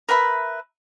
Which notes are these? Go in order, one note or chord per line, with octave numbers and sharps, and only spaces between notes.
A#4 B4 E5 B5